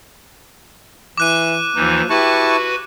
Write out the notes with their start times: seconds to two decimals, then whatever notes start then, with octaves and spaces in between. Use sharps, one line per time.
1.18 E3 D6 F#6 D#7
1.76 D#2 E3 F3 D#4
2.10 E4 F#4 G4 B4 A5 C#6